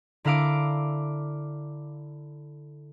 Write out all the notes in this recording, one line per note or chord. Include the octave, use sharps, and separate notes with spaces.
D3 E4 A#4 F5 D6 D7